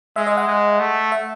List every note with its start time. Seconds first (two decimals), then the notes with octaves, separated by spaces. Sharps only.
0.16 G#3 E5
0.27 D#5
0.37 F#5
0.47 G#3
0.80 A3
1.12 E5